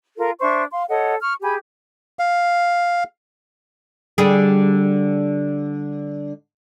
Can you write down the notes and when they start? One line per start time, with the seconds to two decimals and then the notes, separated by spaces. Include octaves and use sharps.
0.17 F4 A4 A#4
0.40 D4 C5 E5 C#6
0.72 F5 C6
0.89 A4 C#5 D#5 F#5
1.22 C#6 F6
1.42 G4 G#4 G#5 B5
2.19 F5
4.18 D3 G3 G#4